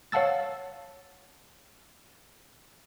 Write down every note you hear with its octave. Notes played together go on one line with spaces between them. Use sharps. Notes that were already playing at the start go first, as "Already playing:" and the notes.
C#5 F5 F#5 A5 E6 A6